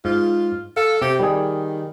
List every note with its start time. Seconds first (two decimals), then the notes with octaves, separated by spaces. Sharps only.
0.05 G#2 F4
0.77 A4 F5
1.02 C3 G4
1.19 D#3 G3 G#4